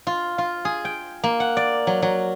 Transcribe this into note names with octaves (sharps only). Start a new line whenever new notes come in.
F4
F4
G#4
G5
A#3
F#5
D5
F#3
F#3